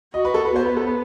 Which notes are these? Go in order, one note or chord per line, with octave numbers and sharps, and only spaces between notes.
F#4 D#5
B4
A4
B4
B3 C5
B4
A4
B4